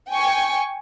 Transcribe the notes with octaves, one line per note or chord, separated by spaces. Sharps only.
G5 G#5 C#6